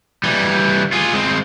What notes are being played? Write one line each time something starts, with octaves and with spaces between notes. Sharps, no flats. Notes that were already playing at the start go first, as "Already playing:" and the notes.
E3 G3
F4 G#4
G#3 C4